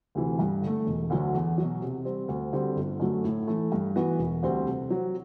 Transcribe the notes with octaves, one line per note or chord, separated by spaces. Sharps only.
D2 C3 E3
G2
D3
A3
E1
D2 D3 F#3
E2
B2 F#3
C3
G3 C4
D2
D3 G3 C4 F#4
G1
F#2 D3 F#3 A3
A2
E3 A3 E4
G2
E3 B3 F#4 B4
E1
D2 D3 G3 C4
C3
F#3 C4